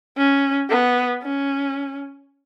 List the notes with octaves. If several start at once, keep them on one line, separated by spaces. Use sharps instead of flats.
C#4
B3
C#4